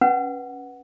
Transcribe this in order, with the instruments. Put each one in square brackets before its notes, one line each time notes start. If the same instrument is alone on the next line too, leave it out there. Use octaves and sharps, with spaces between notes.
[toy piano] C#4 B4 F#5